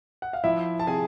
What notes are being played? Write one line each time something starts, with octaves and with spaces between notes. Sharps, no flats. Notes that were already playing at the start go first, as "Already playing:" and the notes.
F#5
F5
F3 E4 E5
A5
C3 G#4 G#5